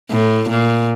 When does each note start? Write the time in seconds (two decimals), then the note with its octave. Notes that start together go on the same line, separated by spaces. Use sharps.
0.11 A2
0.49 A#2